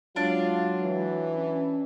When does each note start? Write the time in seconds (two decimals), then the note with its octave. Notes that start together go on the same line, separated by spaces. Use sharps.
0.16 F#3 G#3 D4 F4
0.83 E3
1.34 C#4